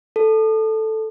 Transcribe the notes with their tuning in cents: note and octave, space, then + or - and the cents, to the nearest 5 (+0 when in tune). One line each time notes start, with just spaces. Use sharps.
A4 +0